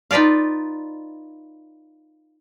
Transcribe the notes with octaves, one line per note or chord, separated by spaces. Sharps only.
D#4 F4 B4 D5 F5